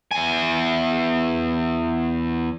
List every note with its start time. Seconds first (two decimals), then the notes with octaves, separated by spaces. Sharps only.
0.11 E2 G#5